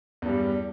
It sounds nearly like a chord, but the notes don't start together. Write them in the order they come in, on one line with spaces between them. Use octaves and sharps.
E2 G2 G3